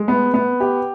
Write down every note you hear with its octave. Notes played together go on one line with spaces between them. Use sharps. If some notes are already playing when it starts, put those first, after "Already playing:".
Already playing: G#3
B3
B3
G4